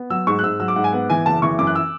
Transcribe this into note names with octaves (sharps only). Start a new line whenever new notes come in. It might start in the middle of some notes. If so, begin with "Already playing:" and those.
Already playing: B3
F#3 E6
G#2 C#6
F#6
G#2 E6
F#3 E6
D6
G#2 F#5
G#5
B3 F#5
E3 G#5
F#1 A5
E3 C#6
F#2 D6
F#6
E6